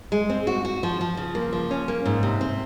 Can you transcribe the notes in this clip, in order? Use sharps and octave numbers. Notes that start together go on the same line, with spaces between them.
G#3
C4
F#4
F#4
F3
F3
C#3
A#3
F3
C#4
A#3
G#2
C3
C4